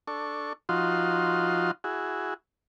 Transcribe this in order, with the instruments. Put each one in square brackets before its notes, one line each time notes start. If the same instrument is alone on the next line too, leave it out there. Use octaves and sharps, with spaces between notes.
[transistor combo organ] D4 A4 C#6
F3 D#4 F4 F#4 C6
E4 F#4 G#4